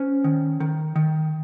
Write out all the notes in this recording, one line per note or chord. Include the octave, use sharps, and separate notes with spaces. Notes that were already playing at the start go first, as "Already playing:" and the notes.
Already playing: C#4 C5
D#3
D#3
D#3